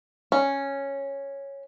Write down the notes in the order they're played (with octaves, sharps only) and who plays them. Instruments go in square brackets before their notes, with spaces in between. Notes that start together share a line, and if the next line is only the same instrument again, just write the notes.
[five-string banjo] C#4